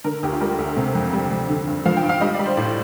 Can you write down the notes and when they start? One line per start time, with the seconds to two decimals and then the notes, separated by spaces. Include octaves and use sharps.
0.04 D3 A#4
0.23 D2 G4
0.32 F4
0.40 G3 A#4
0.59 D2
0.77 C3
0.95 F2
1.13 G3
1.31 F2
1.49 D3
1.67 G2
1.85 F3 F5
1.97 G5
2.03 G2
2.09 F5
2.21 G3 D#5
2.34 D5
2.39 G3
2.46 C5
2.57 A2 D5